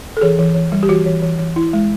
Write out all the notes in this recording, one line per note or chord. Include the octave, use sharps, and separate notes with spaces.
A4
E3 G#4
E3
E3
G3
G4
E3 F#4
E3
E3
E3
E4
G#3